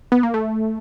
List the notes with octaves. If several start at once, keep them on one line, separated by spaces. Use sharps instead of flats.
B3
A#3
A3